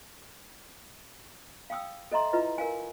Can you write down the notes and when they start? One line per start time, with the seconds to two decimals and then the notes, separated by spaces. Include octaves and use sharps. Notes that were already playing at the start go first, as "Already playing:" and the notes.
1.70 F5 G5 D#6 E6
2.12 A4 D#5 E5 A#5 C6
2.33 E4 F4 B4 D#5
2.58 A#4 F5 G#5